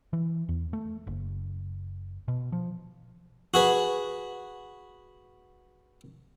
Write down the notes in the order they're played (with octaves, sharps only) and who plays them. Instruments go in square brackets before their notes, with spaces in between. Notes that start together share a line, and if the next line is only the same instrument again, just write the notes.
[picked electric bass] E3
E2
A3
F#1
B2
F3
[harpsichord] F#4 G#4 B4